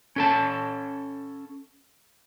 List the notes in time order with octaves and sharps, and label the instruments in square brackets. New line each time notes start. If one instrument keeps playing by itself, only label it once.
[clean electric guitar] C#4 A4 A5